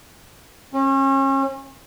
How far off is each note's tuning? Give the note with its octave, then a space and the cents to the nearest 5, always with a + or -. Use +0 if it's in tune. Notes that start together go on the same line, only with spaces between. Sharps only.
C#4 -35